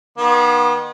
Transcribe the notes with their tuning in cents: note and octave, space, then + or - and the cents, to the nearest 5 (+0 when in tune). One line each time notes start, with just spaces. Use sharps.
D#3 -30 B3 -40